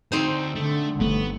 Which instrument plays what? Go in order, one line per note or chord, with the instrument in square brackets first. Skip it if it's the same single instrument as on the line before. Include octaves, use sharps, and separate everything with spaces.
[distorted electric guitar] D2 [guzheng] C4 D#4 C5
[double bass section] D3 [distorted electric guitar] A3
[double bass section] G1 [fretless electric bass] A3 [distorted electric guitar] B3